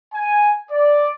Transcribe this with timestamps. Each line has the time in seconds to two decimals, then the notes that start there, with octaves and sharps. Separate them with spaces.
0.13 G#5
0.71 D5